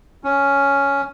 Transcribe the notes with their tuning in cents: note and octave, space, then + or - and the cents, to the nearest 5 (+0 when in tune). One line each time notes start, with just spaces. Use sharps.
C#4 +5